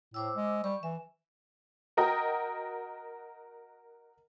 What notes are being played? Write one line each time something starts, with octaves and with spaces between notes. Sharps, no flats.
A2 C5 D6 E6
G#3
G3 C#6
E3 E5
F#4 A#4 D#5 G5